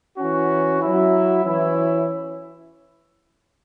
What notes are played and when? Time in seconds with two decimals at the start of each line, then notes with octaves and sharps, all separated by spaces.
0.17 E3 C#4 F#4
0.81 F#3 E4
1.44 E3 C#4 E4